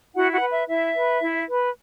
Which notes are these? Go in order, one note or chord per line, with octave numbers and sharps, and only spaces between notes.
E4 F#4 F#5
F#4 F#5
B4
E5
E4 E5
B4
E4
B4